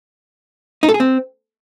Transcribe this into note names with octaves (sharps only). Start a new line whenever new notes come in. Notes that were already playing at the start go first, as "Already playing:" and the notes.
D#4
A4
G#4
C4